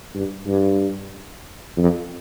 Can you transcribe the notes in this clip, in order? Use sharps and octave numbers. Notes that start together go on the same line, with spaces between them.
G2
G2
F2